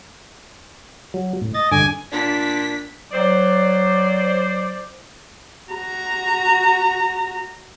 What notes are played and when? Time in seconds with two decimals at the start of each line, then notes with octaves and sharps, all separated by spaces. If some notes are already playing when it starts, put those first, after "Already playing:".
1.14 F#3
1.42 A2
1.55 D#5 A6
1.72 G2 D3 G#5 D6
2.12 A#2 D4 B6
3.12 F#3 C5 D5
5.73 F#4 A#5